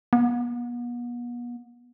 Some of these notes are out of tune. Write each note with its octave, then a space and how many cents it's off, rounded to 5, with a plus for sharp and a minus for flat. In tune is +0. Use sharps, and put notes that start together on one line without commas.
B3 -40